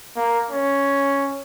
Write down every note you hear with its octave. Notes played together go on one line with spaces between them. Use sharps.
A#3
C#4